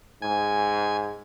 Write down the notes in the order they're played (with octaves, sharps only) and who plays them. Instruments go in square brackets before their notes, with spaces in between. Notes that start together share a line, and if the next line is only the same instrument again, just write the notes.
[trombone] G#2 [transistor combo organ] G#5